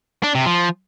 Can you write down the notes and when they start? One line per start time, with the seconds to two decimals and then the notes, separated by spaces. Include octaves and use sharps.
0.23 D4
0.35 C3
0.46 F3